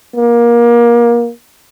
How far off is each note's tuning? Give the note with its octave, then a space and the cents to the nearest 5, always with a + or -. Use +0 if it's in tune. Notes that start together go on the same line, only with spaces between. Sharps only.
A#3 +25